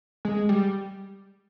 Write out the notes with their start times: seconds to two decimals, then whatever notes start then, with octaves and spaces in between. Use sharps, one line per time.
0.25 G#3
0.49 G3